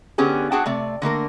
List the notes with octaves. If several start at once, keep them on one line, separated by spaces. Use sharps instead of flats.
D3 B3 C#4 G4 G#4
D4 F#4 G#4 F#5 G5 A5
C3 A3 D5
D3 A3 A#3 A#4